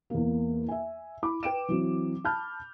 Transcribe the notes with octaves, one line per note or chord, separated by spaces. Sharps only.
E2 A#3
E5 G#5
E4 B5 D6
B4 G5 D7 E7
E3 F#3 C4
A5 B5 F6 G6